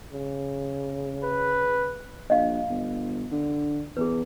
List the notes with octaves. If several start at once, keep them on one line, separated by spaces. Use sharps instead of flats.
C#3
B4
A#1 D#5 F5
G1
D3
E2 G#4 B4